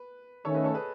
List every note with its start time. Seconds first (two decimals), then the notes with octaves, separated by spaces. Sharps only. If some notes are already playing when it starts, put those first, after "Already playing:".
Already playing: B4
0.45 D#3 A3 C#4 A4 C#5
0.54 B4 D#5
0.64 A4 C#5
0.74 G#4 B4